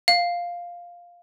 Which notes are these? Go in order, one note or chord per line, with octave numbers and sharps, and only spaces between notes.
F5